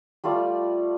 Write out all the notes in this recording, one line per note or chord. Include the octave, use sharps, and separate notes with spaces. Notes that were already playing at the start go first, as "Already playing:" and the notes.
G3 A3 F4 D5